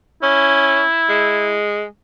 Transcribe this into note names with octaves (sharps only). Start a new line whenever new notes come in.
C#4 E4
G#3